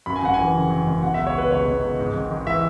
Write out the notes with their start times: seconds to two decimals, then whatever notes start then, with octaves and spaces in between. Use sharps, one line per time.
0.06 F#2 B5
0.16 G#5
0.22 G#1 F#5
0.34 G#5
0.39 E3
0.54 C#3
0.70 F#2
0.86 G#1
1.03 B2 F#5
1.14 C#2 E5
1.27 C#5
1.35 B2 B4
1.50 C#2 C#5
1.67 B2
1.83 C#2
1.99 G#2
2.14 G#1
2.31 G#1
2.47 E3 E5